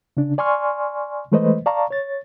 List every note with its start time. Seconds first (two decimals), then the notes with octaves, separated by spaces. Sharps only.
0.17 C#3 D4
0.38 D5 G#5 C6 C#6 F6
1.32 E3 G#3 A3 B4 C5 D#5
1.66 D5 F5 A5 A#5 C#6
1.90 C#5 A6